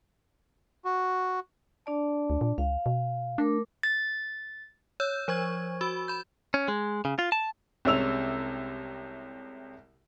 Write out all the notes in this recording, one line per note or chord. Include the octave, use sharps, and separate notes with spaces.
F#4
D4 D5 A5
D2
A#2
C#2 F5
B2
A3 D4 A#4 D6
A6
C#5 E6 G6
F3 C5 C#6 G#6
F#4 B5 E6
B5 G6
C#4
G#3
C#3
F4
A5
C2 C3 G#3 C#4 E6 F7